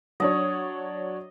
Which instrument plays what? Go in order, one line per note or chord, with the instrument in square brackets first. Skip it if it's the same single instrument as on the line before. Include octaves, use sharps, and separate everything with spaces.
[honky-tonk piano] F#3 D4 C#5 [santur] D#5